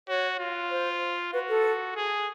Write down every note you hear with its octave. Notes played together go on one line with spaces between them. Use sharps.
F#4 C#5
F4
C5
F#4 B4
A4
G#4